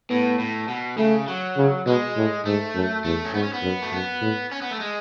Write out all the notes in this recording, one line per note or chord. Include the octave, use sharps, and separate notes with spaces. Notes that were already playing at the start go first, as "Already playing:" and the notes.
A2 B3
A2
B2
C#3 A3
F#3
C#3
B2 G#3
A2
G#2 A3
F#2
E2 A3
C#4
G#2 B3
C#4
B3
F#2
A3
F#2 B3
A2
C#4
B3
A3
G#3